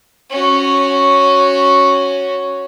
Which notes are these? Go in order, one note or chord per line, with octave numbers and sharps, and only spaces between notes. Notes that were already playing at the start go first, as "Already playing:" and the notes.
C#4 F#4